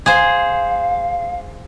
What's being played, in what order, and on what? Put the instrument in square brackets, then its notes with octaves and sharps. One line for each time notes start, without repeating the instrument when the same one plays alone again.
[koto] G#4 C5 [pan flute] F5